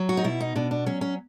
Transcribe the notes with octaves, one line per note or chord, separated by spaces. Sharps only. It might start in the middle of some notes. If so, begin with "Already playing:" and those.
Already playing: F#3
F#4
D#4
B2 E4
D#4
B2 D4
D4
F#3 C#4
C#4